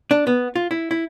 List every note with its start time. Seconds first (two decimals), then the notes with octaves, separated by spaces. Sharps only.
0.11 D4
0.27 B3
0.56 F4
0.71 E4
0.91 E4